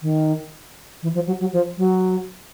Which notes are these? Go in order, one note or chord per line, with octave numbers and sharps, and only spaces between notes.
D#3
E3
F3
F#3
F#3
F3
F#3